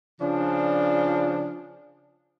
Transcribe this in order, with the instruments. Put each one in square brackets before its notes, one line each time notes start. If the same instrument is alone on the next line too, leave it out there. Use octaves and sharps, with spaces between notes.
[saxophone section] C#3 F3 D4